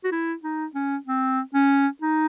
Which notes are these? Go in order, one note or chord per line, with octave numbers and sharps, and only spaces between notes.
F#4
E4
D#4
C#4
C4
C#4
D#4